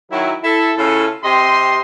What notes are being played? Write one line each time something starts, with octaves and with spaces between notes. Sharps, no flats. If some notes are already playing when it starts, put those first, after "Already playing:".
D#3 F#3 E4
E4 A4
C#3 C#4 E4 F4 A4
C3 C4 G4 D#5 C6